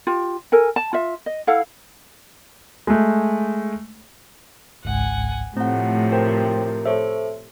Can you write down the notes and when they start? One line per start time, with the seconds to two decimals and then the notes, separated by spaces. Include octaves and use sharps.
0.07 F4 G4
0.52 A4 A#4 G#5
0.76 A5
0.93 F4 E5
1.26 D#5
1.47 E4 A4 F5 F#5
2.87 G#3 A3
4.85 G#1 C#2 G#2 F#5 G#5
5.57 A2 C3 F3 A3 C4 F#5
6.12 A#4 C5 G5
6.85 A4 C5 C#5 E5